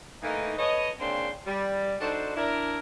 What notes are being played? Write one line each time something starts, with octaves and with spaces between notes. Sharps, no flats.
E3 A3 A#3 D#4
A4 B4 C#5 D#5
C#3 A#3 C4 D4 G5 C6
G3
D4 D#4 F#4 A4 C5
D4 E4 A#4